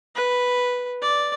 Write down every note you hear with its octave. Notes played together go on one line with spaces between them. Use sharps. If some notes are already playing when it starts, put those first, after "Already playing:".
B4
D5